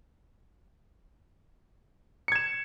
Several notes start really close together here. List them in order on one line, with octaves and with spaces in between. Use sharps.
C#7 G#6 E7